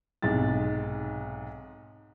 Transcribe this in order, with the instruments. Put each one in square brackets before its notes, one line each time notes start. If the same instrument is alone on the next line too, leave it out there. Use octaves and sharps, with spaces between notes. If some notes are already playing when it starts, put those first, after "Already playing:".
[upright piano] B1 G#2 C3 A6